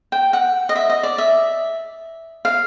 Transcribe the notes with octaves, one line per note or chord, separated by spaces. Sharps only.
G5
F#5
D#5
E5
D#5
D5
E5
F5